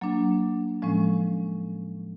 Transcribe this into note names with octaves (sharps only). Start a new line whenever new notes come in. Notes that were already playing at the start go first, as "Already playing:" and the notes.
F#3 A#3 D4
A2 F3 G#3 C#4